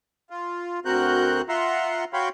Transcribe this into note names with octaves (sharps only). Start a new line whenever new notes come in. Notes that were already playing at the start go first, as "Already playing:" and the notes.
F4
D2 C4 F#4 A#4 F#6 G6
F4 E5 F#5 A#5 C6
F#4 C#5 F5 G5 B5 C6